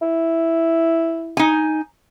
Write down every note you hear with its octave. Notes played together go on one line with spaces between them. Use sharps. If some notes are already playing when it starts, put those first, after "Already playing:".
E4
D#4 G#5